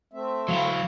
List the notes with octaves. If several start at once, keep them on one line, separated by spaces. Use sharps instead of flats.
A3 C4 E5
F#3 E4 F5